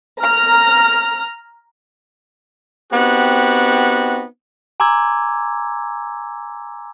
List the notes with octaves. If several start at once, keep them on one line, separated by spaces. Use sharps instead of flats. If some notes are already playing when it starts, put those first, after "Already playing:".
A#5 F6
B3 C4 D#4 F#4 G4
G#5 A#5 C6 D6 E6 G#6